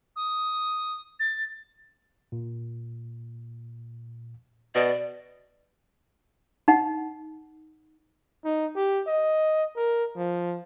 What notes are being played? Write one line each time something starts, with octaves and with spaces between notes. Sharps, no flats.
D#6
A6
A#2
B2 D5
D#4 F#5
D#4
G4
D#5
A#4
F3